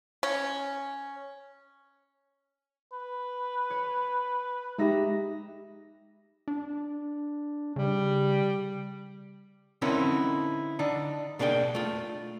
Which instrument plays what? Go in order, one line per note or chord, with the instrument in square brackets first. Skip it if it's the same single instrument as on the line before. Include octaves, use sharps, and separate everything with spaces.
[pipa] C#4
[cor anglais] B4
[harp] C#5
[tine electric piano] G#3 G4 [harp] D#4 E5 A#6
[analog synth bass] D4
[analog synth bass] C#3 [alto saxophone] G3
[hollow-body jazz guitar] D3 C4 C#4 D#4 E4 A#4
D3 D4 D#4
B2 A#3 D4 E4 G#4 G5
A3 F4